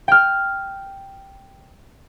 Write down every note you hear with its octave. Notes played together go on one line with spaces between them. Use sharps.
G5 F6